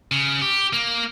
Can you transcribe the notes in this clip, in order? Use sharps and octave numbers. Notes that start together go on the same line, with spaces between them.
C#3
G4
A#3